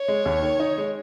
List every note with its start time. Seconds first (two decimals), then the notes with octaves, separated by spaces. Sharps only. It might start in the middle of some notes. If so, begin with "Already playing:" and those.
Already playing: C#5
0.08 G#3
0.26 D#2
0.43 D#3
0.60 D#4
0.78 G#3